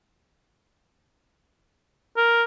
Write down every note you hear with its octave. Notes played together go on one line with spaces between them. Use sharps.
A#4